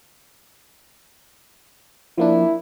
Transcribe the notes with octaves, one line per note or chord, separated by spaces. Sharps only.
F3 A#3 D4 E4